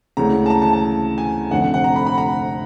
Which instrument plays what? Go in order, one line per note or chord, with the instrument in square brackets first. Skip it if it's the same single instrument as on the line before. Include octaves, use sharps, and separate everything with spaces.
[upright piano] D2 C#3 E3 G#3 A#5
A5
A#5
A5
A5
G#5
F1 F2 D3 F#5
F#5
F#5
A#5
B5
B5
A#5